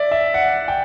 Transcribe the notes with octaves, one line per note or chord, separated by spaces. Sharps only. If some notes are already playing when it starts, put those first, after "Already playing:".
Already playing: D5 E5
E5
F#5
G5